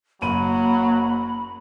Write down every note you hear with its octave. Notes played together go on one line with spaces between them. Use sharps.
F#1 F#3 A#3 B5 D#7